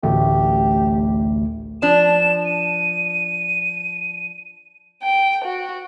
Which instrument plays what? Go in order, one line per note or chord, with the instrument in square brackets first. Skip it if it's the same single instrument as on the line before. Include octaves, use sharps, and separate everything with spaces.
[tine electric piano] A1 D2 A3 [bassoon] G4
[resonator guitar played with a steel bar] F3 D4 [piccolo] E7
[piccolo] D#7
[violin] G5
F#4